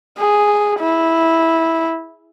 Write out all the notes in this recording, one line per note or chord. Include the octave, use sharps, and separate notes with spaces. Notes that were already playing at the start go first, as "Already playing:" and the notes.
G#4
E4